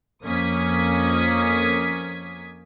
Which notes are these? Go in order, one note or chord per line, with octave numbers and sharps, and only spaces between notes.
F2 A#3 C#4 D#6 G#6 B6